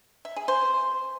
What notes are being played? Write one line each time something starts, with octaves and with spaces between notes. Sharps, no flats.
E5
G#4
C5